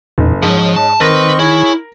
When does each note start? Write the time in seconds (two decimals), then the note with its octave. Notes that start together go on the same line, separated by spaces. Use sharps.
0.18 F#1 E2 A#2 D#4
0.42 G#2 F3 C#5 D#5
0.76 A5
1.00 D#3 C4 A#4 B4 D#5 C#6 A#6
1.39 E4 G#4 C#5